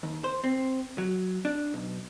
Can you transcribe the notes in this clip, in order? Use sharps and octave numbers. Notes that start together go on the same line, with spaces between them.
D#2
C5
C4
F#3
D4
B1